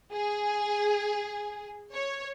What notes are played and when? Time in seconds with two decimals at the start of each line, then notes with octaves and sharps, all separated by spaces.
0.12 G#4
1.92 C#5